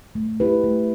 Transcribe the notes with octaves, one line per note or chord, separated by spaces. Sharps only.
A3
E4 G4 B4
A3